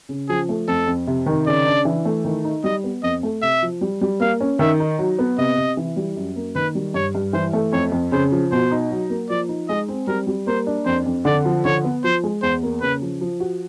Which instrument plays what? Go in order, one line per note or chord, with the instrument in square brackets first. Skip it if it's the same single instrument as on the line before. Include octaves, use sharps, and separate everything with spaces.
[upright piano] C#3
[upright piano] F3 [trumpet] G#4
[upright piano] A3
[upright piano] F2 [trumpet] A4
[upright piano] F2
C3
D#3
[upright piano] C#3 [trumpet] D5
[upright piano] D4
E3
A3
D#3
D#4
[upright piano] G3 [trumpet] D#5
[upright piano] B3
[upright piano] F2 [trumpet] D#5
[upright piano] A3
[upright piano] C3 [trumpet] E5
[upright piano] F3
G3
G3
[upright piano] A#3 [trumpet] F5
[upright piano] C#4
[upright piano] D#3 [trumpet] E5
[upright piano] D#4
F#3
B3
[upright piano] C3 [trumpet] D#5
[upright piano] C3
E3
G3
F#2
A#3
[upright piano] D#3 [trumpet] B4
[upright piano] G3
[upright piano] G2 [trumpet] C#5
[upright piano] G2
[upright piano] E3 [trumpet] C5
[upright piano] A3
[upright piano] F2 [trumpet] C#5
[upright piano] F2
[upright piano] C#3 [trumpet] C5
[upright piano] F3
[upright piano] B2 [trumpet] C5
[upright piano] D#4
F#3
A#3
[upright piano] F3 [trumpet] D5
[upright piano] D#4
[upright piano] G#3 [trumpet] D#5
[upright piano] C4
[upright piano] G3 [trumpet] A#4
[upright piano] G3
[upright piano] A#3 [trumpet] C5
[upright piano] D4
[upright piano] F2 [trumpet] C5
[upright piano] F2
[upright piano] D3 [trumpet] D5
[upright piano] F3
[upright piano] D3 [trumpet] C#5
[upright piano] B3
[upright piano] F3 [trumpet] C5
[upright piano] G#3
[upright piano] E2 [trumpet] C5
[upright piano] A#3
[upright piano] C#3 [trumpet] B4
[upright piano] F3
F3
F#4